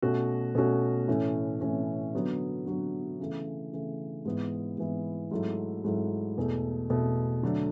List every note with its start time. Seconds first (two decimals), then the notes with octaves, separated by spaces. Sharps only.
0.02 B2 A3 C#4 F#4
0.55 B2 A3 C#4 F#4
1.08 A2 E3 A3 C#4
1.61 A2 E3 A3 C#4
2.14 D3 F#3 B3 F#4
2.66 D3 F#3 B3 F#4
3.20 C#3 E3 A3
3.73 C#3 E3 A3
4.25 G#2 E3 B3 E4
4.78 G#2 E3 B3 E4
5.31 G#2 F#3 A3 E4
5.84 G#2 F#3 A3 E4
6.38 E2 B2 A3
6.90 E2 B2 A3
7.43 D3 F#3 A3 D4